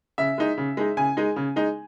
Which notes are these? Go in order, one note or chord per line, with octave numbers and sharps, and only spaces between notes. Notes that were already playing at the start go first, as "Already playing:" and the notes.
C#3 E5
G#3 D#4
C#3
G#3 D#4
C#3 G#5
G#3 D#4
C#3
G#3 D#4